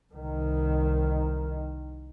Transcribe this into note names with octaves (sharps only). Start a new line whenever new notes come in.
C2 D#3